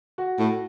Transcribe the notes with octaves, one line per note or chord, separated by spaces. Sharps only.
F#4
A2